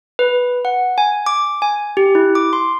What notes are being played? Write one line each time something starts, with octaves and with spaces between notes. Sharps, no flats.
B4
F#5
G#5
D6
G#5
G4
E4
D6
C6